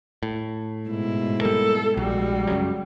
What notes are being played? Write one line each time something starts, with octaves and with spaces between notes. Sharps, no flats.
A2
G#2 B2 E4
G3 A#3 A4
A#1 G3 G#3 F#4
F#2 C#3 F#3